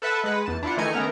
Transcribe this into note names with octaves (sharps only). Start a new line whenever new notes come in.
A4 B4 E5 F#5 A5
G#3 B4 F#5
E2 A5
D4 E4 F4 F#5
D#3 E3 A3 D#4 G#5 C#7
D#3 A3 B3 C#4 A#4 A#5